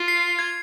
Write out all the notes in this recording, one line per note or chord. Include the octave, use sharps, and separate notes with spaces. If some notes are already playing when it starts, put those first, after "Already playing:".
Already playing: F4
C7
G#6